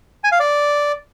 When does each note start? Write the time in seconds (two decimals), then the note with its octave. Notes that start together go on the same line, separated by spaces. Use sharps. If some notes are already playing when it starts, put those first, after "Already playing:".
0.24 G#5
0.32 F5
0.40 D5